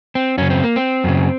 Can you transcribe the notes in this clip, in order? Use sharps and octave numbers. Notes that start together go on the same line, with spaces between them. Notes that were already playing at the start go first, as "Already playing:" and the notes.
C4
F#2 C#3 C#4
C4
A#3
C4
F#2 C#3